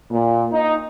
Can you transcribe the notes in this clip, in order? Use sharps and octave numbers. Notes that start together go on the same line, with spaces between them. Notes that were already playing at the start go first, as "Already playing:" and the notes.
A#2
D#4